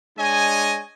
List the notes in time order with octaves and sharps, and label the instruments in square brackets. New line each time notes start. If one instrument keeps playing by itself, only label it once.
[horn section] G#3 D4 C#5 D#5 G#5